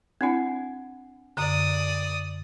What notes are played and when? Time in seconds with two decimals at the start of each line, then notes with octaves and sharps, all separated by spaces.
0.21 C4 D4 E4 F#5 G#5
1.37 F#2 D3 D5 D#6